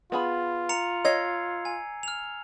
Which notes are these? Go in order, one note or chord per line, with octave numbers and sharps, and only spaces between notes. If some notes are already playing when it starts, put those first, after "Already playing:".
B3 F4 G#4 B5
A#5 C#7 F7
C#5 D#5 E6 G#6 C7
G#5
F6 F7